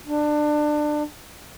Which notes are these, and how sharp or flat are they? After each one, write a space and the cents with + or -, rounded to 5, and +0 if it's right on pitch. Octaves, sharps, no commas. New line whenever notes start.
D4 +25